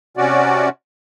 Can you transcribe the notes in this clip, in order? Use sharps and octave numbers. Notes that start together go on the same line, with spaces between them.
C3 C#4 F#4 D5